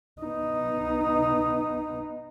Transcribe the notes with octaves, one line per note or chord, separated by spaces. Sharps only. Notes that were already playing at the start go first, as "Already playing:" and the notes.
B3 D#4